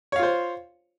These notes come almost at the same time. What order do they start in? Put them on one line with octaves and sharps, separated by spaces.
C#5 F5 F4 C5